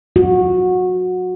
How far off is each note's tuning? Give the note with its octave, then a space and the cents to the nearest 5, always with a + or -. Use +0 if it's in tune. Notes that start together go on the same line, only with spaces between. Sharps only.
F#4 -20